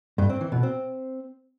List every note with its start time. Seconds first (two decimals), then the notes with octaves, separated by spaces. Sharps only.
0.18 G2
0.29 C4
0.41 E3
0.52 B2
0.63 C4